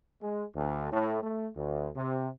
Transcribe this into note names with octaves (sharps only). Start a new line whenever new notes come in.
G#3
D2
A2
A3
D2
C3